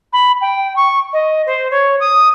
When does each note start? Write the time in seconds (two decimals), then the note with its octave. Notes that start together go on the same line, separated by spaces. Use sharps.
0.13 B5
0.41 G5
0.76 C#6
1.13 D#5
1.47 C5
1.71 C#5
2.00 D#6